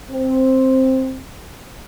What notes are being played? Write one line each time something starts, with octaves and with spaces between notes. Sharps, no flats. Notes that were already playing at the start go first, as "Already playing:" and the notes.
C4